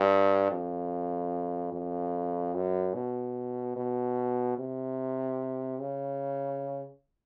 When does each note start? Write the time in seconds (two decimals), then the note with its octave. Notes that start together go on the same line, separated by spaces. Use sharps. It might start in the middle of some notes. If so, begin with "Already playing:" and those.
Already playing: G2
0.51 F2
1.73 F2
2.55 F#2
2.94 B2
3.76 B2
4.58 C3
5.80 C#3